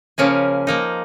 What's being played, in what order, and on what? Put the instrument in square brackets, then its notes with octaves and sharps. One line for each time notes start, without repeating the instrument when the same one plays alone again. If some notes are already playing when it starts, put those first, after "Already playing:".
[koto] C#3 F3 A#3 C#4 G#4
F3 A#3 D#4